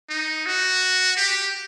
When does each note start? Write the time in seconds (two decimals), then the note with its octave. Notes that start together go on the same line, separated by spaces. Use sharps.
0.09 D#4
0.46 F#4
1.17 G4